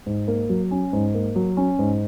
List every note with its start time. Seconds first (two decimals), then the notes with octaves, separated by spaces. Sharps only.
0.06 G#2
0.28 A#3
0.49 F#3
0.71 C#4
0.93 G#2
1.14 A#3
1.36 F#3
1.57 C#4
1.79 G#2